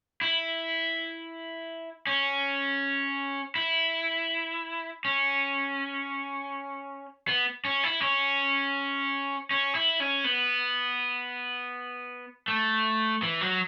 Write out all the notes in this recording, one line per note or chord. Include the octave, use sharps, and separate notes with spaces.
E4
C#4
E4
C#4
B3
C#4
E4
C#4
C#4
E4
C#4
B3
A3
E3
F#3